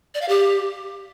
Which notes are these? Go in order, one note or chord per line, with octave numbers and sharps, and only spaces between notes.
D5
F5
G4